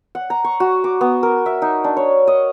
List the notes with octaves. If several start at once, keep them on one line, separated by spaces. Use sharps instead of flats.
F#5
A#5
C#6
F#4
D6
B3
A#4
E5
D#4
D4
C#5
D#5